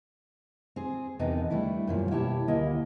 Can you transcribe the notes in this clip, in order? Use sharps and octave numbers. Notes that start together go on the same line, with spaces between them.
C4 G#4
E2 C3 B3 D#4 A4 A#4
G3 A3 D4 E4
F#2 A#2 F3
B2 E4 G4 C#5 A5
D2 A#3 E4 D#5